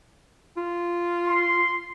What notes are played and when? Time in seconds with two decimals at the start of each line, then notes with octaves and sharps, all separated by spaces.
0.57 F4
1.29 C6